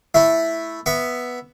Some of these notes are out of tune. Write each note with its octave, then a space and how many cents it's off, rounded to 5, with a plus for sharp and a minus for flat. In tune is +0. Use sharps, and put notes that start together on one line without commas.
A3 +0 E4 +0 E5 +0
B3 +0 E5 +0 C#6 +10